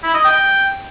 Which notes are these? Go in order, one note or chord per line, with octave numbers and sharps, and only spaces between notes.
E4
D#5
G5